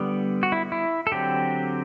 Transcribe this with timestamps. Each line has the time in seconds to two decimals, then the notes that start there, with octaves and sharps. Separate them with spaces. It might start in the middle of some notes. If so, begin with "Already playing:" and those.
Already playing: D3 G3 B3
0.43 F#4
0.52 E4
0.72 E4
1.07 A4
1.12 D3 F#3 C4 G4